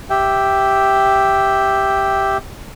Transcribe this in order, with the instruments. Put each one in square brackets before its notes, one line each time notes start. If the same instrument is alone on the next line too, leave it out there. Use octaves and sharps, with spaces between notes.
[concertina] G4 E5 G5